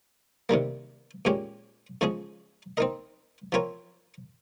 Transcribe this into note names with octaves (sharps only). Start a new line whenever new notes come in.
C3 D#3 G3 A#3
A#2 G#3 C#4 G4 C#5
C#3 F3 G#3 C#4 G#4
C4 D#4 A#4 D#5
F3 C4 F4 A#4 C#5